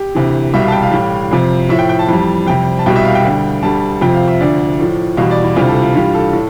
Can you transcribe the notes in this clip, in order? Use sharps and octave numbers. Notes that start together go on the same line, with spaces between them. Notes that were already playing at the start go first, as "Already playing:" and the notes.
Already playing: G4
D2 C3 E3
C2 B2 G3 E5
F5
A5
G5
F5
A2 E3 G3
F2 C3 F3
A2 F3 E5
G5
G5
A5
F2 E3 G3
F2 C3 G3 G5
A5
C2 B2 G3 G5
E5
F5
G5
D2 D3 G3
D2 D3 G3 A5
F2 C3 F3 G5
F5
E5
D2 D3 F3 D5
A2 F3
E2 B2 G3 F5
D5
E4
D2 C3 E3 G3 F4
A4
F4
G2 E3 G3 F4
A4
A2